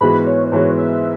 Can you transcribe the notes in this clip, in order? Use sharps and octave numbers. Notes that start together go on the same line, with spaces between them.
G#2 E3 G#3 B3 F#4 B5
C#5
G#2 E3 G#3 B3 F#4 C#5
E5